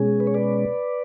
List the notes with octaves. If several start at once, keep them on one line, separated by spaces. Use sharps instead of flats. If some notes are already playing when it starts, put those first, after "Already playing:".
Already playing: B2 G#3 C#4 G#4
B4
C#5
B4 D5